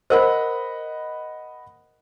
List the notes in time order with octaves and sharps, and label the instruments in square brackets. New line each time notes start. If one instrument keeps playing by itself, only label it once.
[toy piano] A#4 C5 [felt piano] D#5 F#5 B5